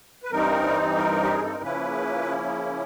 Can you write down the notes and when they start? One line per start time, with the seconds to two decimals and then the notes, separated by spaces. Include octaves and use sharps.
0.23 B4
0.31 G2 E3 G3 C4 D#4 A#4
0.97 A#4
1.23 G4
1.33 G#4
1.44 A4
1.53 A#4
1.62 C#3 F3 A#3 C#4 E4 B4